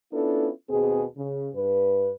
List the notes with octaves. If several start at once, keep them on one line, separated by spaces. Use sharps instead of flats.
B3 C#4 D4 E4 F4 A4
D#2 B2 C4 G#4
C#3
G2 B4